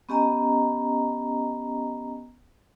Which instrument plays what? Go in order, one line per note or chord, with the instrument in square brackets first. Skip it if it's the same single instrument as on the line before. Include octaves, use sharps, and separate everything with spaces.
[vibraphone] B3 C#4 G4 D#5 G#5 A#5